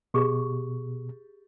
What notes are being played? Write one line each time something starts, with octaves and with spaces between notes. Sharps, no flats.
B2 G4 G#4 C#6